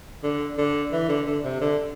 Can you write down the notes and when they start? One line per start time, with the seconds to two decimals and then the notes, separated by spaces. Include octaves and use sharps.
0.23 D3
0.58 D3
0.92 E3
1.09 D3
1.27 D3
1.44 C3
1.61 D3